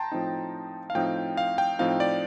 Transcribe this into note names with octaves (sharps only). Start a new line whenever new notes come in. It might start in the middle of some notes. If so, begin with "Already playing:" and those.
Already playing: G5 A5 A#5 C6
A2 F3 C4 D#4
F5
A2 F3 C4 D#4 G5
F5
G5
A2 F3 C4 D#4 F5
D5